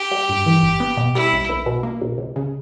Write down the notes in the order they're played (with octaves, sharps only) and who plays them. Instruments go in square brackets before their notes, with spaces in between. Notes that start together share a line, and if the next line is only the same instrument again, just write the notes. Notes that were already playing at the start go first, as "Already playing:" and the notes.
Already playing: [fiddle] G4
[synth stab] G3
G2
E3
G1
B3
B2
[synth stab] G3 [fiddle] E4
[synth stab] B1
B1
B2
A#3
B1
C#2
C#3